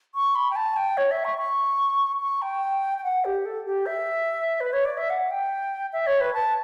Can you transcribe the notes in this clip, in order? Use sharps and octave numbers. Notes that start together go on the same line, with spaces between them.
C#6
B5
G5
A5
G5
C#5
E5
C#6
C#6
C#6
G5
G5
F#5
G4
A4
G4
E5
B4
C#5
D5
E5
F#5
G5
E5
C#5
B4
A5